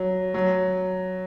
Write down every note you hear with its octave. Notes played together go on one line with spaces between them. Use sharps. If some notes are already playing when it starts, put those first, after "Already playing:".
Already playing: F#3
F#3